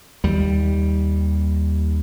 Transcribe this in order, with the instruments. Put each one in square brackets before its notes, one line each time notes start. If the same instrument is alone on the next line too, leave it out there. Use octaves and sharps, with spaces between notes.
[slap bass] D#2 G3